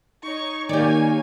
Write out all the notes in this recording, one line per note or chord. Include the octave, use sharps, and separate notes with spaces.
D#4 C#5 C#6
D#3 A#3 G4 C#5 D5 G#5